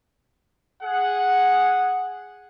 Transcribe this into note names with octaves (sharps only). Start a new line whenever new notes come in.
G#4 F#5